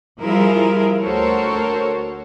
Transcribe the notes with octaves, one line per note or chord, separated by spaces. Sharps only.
F3 G3 E4 F4 G#4 A#4
D2 F#4 A4 A#4 C5 C#5